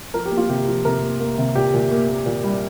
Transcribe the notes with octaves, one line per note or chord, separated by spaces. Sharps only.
F3 A#4
G4
A#3
F4
C3 G4
F3
C3 A#4
A#3
A#3
C3
A#2 G4
A#2
A#3
A#3
A#2
G3